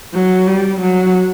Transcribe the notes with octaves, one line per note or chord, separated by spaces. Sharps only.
F#3
G3
F#3